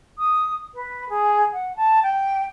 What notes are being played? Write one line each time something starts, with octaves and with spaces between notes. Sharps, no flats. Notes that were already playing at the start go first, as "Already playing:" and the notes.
D#6
B4
G#4
F#5
A5
G5